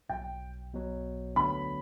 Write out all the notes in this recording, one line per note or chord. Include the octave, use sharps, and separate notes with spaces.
B1 B2 F#3 G5
B1 B2 F#3
D2 D3 F#3 B3 D4 B5